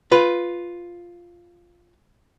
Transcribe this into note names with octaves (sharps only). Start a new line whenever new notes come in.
F4 B4